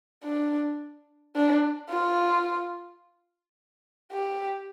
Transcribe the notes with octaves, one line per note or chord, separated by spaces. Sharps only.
D4
D4
F4
G4